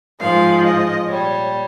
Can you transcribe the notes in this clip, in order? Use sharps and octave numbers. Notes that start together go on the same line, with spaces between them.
G#2 F3 G#3 F5
D#5
A#2 G3 C#5